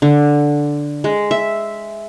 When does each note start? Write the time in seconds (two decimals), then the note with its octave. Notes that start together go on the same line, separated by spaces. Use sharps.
0.02 D3
1.04 G#3
1.31 E5